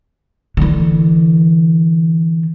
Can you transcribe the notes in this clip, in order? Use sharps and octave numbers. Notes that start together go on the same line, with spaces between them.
D3 E3